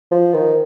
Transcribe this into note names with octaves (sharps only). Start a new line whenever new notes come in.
F3
D#3